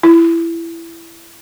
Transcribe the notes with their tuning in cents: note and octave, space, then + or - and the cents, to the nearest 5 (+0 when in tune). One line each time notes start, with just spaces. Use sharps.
E4 +20